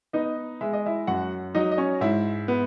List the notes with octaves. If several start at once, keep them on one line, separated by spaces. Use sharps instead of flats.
B3 D#4 D#5
G#3 E5
D#5
E4 E5
F#2 F#4 F#5
F#3 D#4 D#5
D#5
C#4 C#5
G#2 E4 E5
B3